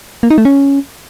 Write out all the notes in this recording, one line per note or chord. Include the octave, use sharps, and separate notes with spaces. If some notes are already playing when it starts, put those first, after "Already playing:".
A#3
D#4
A3
C#4